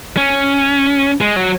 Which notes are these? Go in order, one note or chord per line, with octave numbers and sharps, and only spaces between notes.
C#4
G#3
F#3